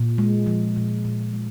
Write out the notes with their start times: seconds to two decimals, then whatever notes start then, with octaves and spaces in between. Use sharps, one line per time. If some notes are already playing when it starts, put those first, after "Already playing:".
Already playing: A#2
0.18 G#3
0.46 F3
0.76 A#2
1.05 A#2
1.33 G#3